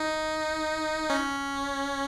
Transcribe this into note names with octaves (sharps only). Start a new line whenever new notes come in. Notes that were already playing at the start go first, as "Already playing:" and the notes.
Already playing: D#4
C#4